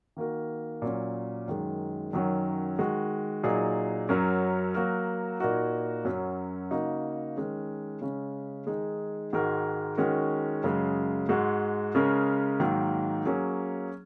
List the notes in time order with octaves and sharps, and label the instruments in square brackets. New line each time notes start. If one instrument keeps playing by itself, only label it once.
[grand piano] D#3 A#3 F#4 A#4
A#2 F#3 C#4
F#2 D#3 G#3
F#2 D#3 F#3 C#4
D#3 G#3 F#4
A#2 F#3 D#4 G#4
F#2 F#3 C#4 A#4
F#3 A#3 F#4 A#4
A#2 A#3 D#4 F#4 A#4
F#2 F#3 C#4
C#3 A#3 D#4 F#4
D#3 G#3 C#4 A#4
C#3 G#3 C#4
D#3 G#3 D#4 G#4
G#2 D#3 G#3 F#4 A#4
D#3 G#3 C#4 F#4 A#4
F#2 C#3 G#3
G#2 G#3 F#4
C#3 G#3 C#4 A#4
G#2 D#3 F#3 A#3
F#3 A#3 C#4 G#4